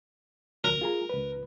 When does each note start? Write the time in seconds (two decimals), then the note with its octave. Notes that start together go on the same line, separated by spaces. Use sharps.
0.64 D2 A#4
0.81 F4 G#4 A#5
1.09 C#2 B4